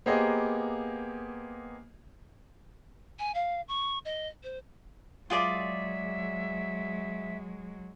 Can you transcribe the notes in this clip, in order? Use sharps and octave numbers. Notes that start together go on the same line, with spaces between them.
A#3 B3 G4 G#4 C5 D#5
G#5
F5
C#6
D#5
C5
F#3 G#3 F4 G#4 D5 E5